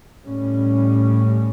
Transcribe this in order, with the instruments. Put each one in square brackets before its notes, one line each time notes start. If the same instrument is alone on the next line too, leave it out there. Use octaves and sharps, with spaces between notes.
[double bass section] A2 G3 C#4